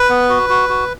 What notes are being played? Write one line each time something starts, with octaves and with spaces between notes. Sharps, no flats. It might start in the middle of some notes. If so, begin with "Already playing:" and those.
Already playing: B4
B3
F#4
F#4
F#4